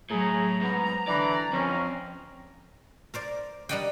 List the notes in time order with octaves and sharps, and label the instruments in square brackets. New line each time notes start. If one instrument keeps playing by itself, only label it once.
[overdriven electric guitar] A2 [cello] F#3 [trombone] G#4 [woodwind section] A#5
[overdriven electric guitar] G#2 [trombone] B3
[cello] D3 [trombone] E3 [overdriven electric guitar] D5
[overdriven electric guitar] F2 [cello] C4 [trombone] C#4
[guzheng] A#4 C5 D5
G3 A#4 D5 D#5 F#5 G5